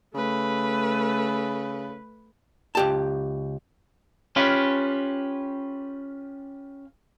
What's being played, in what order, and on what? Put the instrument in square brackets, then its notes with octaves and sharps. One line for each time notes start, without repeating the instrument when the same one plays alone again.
[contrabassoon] C#3 [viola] A3 B4
[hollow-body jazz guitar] C#2 G4 A5
[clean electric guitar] C#4 F4 G4 B4